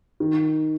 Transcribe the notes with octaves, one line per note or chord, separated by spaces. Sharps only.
D#3